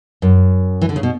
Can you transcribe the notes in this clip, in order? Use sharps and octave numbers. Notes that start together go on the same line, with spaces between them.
F#2
E3
D3
C#3
B2